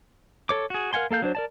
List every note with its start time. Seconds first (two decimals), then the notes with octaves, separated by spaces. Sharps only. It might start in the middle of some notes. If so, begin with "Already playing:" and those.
0.49 A4 C#5 D6
0.70 F#4 G#4
0.93 A#4 F5 F#5 G#5 C6
1.11 A#3 A4 F5 G6
1.22 F#3 D4 C5
1.35 A#4 D5 A5